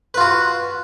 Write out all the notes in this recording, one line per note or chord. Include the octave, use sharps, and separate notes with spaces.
F4 F#4 B4